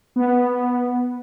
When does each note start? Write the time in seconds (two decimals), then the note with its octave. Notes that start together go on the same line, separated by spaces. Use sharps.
0.16 B3